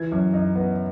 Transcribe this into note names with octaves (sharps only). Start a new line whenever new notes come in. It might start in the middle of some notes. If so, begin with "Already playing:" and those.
Already playing: E3 G#6
F#2
D#4
B3